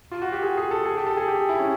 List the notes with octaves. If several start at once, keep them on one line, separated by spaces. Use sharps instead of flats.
F4
F#4
G4
G#4
G#4
A4
G#4
G4
A4
G#4
G4
E4
C#4